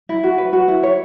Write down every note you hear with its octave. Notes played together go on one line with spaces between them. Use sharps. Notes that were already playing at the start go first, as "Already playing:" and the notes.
E4
F#4
B4
F#4
E4
C#5